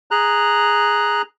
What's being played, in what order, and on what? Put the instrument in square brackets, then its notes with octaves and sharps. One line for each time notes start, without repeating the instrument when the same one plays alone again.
[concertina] G#4 A#5 F#6